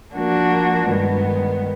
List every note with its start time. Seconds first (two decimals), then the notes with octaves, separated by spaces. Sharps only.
0.15 F3 A#3 D4 F#4
0.89 G2 D#3 G#3 B3